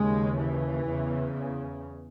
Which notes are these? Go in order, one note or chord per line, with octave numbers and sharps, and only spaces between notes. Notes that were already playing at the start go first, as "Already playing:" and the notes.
Already playing: D#2 C#3 G#3
E3
E2 C#3